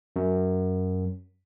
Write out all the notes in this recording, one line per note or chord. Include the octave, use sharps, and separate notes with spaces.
F#2